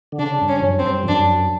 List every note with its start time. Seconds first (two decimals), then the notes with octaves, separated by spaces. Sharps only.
0.12 D3
0.19 C#3 D4
0.41 G2
0.48 C#4
0.59 F2
0.63 F#2
0.79 C4
0.86 G2
1.03 F2
1.08 F#2 D4